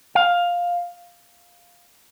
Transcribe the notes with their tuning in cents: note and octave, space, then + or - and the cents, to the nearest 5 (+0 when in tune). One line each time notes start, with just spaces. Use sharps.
F5 +10